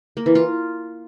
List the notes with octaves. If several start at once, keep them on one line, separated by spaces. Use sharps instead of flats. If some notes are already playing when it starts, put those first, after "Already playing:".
A#3
E3
F4